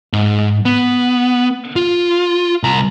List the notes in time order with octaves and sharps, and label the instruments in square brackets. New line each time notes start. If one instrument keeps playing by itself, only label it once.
[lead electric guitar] G#2
B3
F4
C2 A#5